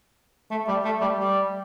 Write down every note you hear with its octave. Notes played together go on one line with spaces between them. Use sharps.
A3
G3
A3
G3
G3